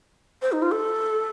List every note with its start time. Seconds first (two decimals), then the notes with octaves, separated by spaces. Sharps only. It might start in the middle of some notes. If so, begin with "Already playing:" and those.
0.42 C5
0.52 D#4
0.62 F4
0.71 A4